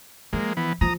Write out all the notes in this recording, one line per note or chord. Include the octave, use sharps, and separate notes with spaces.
F3 G#3 A#3
E3 B3
F3 A#5 D#6